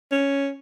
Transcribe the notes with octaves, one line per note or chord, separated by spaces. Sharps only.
C#4